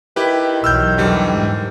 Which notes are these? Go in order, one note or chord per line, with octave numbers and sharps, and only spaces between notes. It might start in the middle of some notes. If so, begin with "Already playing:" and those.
D#3 E4 G4 B4
B1 E2 F#3 E6 F6 G6
D3 E3 G3
G#2